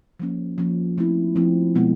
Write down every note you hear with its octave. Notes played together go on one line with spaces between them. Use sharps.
F3 A#3 C#4
F3 A#3 C#4
F3 A3 C4 E4
F3 A3 C4 E4
B2 G#3 B3